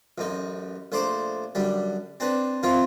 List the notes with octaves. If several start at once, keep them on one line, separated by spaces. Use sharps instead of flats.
A1 F#2 D#4
A#1 A3 C5 D5 A#5 D6
F#2 D3 G3
C4 D4 B4
A#2 D#3 F3 C4 E4 F4